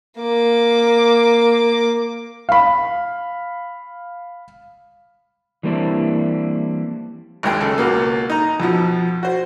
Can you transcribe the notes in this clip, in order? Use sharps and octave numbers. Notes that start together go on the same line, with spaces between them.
A#3 D6
F5 B5
E3 G3 A#3 C4 D4 E4
G#1 D#2 G#3 G5
C#3 A4
C#2 B2 A#3
D#4 A#5
F2 B2 F3
F#4 C5